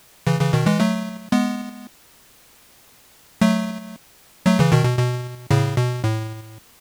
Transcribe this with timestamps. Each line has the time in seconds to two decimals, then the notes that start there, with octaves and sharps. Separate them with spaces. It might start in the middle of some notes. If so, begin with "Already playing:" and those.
0.27 C#3 E3
0.40 C#3 E3
0.53 B2 D#3
0.67 E3 G#3
0.80 F#3 A3
1.32 G#3 B3
3.41 F#3 A3
4.46 F#3 A3
4.59 C#3 E3
4.72 B2 D#3
4.85 B2
4.99 B2
5.51 A2 C#3
5.77 B2
6.04 A2